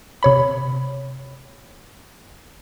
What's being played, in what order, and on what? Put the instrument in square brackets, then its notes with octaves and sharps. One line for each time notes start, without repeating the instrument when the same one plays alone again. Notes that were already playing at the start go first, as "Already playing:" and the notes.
[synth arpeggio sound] C3 C#5 B5